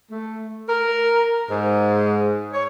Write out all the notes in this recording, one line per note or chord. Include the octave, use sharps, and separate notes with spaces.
A3
A#4
G#2
C#5